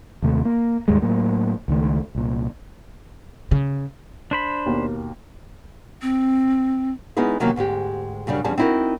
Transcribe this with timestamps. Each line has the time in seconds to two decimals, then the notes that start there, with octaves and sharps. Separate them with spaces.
0.22 D#2 C3 A3
0.45 A#3
0.88 D#2 G#2 G3 G#3
1.02 A2 F#3 A#3
1.68 C#2 D#3 A3
2.15 C2 A#2
3.51 C#3
4.31 D4 C5 B5
4.66 D#2 B2 A#3
6.02 C4
7.17 G#3 B3 C#4 D#4 E4 G#4
7.40 C3 D#3 E3 F#3 A#3 C#4
7.56 D2 G#2 G#3 G4
8.27 F#2 C#3 G3 D4
8.44 E2 F3 G3 C#4 G#4 A5
8.58 C4 D#4 E4 F#4 A#4